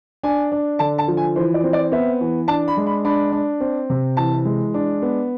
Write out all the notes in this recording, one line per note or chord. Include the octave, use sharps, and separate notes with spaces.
D4 G#5
D4
D3 A5
A5
F3
G#5
E3 C5
D5
C4
D5
B3 E5
E3
D4 A5
B5
G#3
B5
D4 B5
D4
C4
C3
E3 A5
G#3
D4
B3